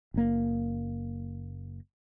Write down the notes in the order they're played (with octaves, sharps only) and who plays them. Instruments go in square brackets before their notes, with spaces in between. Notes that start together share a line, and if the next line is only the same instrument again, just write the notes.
[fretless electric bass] F#1 A#3